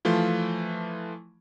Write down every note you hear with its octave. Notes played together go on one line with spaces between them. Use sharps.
E3 F3 A3 F4